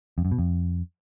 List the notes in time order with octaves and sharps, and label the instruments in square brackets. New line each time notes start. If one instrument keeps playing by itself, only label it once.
[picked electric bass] F2
F#2
B2
F2